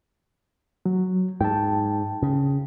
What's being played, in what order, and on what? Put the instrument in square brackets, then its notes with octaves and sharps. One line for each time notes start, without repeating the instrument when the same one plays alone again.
[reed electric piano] F#3
[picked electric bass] G#2 [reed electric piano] G5 A5
[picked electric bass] C#3